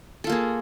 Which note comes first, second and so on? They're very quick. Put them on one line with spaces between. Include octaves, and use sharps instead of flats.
A4 F4 A#3 G#4